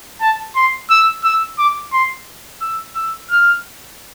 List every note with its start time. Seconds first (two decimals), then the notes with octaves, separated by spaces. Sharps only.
0.21 A5
0.56 C6
0.90 E6
1.24 E6
1.58 D6
1.93 C6
2.61 E6
2.95 E6
3.30 F6